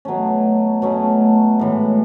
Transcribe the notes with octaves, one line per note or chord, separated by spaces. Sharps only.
B2 F#3 A3 C#4
B2 F#3 A3 C#4
A2 E3 G#3